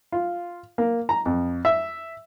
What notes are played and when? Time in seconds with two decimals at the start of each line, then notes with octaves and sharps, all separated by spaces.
0.12 F4
0.78 A#3
1.09 A#5
1.26 F2
1.65 E5